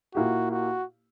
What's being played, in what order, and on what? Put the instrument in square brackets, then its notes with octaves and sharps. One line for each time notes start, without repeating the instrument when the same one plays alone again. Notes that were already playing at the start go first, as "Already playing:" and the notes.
[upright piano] A#2 A#3 E4 G4 [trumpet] F#4
[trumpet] F#4